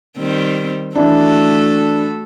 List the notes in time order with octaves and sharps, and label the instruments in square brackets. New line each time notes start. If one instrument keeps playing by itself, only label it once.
[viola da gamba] D#3 G3 C4
[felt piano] E3 D4 [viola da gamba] A3 F#4 A4